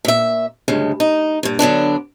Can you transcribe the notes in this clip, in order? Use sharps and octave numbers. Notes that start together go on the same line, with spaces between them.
A#2 E5
D2 G2 C#3 G#3
D#4
G2 A#2
D3 F#3 B3 D4